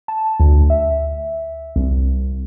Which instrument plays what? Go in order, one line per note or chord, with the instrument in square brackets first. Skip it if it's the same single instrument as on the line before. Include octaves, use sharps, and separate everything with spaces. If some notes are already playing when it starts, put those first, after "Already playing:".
[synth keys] A5
D2
E5
C2